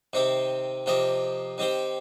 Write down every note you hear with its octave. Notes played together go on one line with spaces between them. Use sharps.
C3 D#3 C4 G4
C3 F3 A#3 G4 D#5
D#3 C4 G4 C5